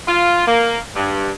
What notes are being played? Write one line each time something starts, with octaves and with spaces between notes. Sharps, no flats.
F4
A#3
G2